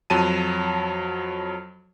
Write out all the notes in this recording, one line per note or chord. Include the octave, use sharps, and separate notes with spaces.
F2 F#3 A5 D#7